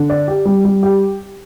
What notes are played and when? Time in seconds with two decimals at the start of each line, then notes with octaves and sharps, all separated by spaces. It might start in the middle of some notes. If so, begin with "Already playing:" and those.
Already playing: D3
0.10 D5
0.28 G4
0.45 G3
0.65 G3
0.83 G4